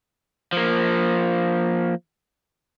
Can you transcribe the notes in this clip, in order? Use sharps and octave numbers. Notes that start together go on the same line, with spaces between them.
F3 A#3